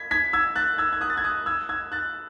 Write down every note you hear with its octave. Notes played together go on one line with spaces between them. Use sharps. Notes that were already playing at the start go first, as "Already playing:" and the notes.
Already playing: G#6 B6
G#6 B6
E6 G#6
F#6 A6
E6 G#6
G#6
D#6 F#6
A6
G#6
D#6 F#6
E6 G#6
E6 G#6
F#6 A6